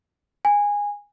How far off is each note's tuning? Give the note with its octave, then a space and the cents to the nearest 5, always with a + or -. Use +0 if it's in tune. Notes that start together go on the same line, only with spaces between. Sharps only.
G#5 -15